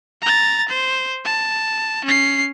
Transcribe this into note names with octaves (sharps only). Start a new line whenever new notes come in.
A#5 A6
C5
A5
C#4 C7